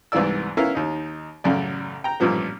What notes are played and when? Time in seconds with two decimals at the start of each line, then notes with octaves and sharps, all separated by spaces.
0.12 C2 G#2 E3 B3 D5 E6
0.57 B3 C#4 E4 A#4 F5
0.75 D#2 D#4
1.44 A1 F#2 C#3 D5
2.04 G5 A#5
2.20 A1 G2 A#2 F3 B3